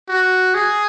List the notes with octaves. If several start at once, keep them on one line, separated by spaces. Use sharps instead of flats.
F#4
G#4